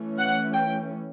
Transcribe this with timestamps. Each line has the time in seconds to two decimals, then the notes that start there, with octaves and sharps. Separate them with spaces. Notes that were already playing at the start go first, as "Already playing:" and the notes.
Already playing: E3 A3 C#4
0.19 F#5
0.54 G5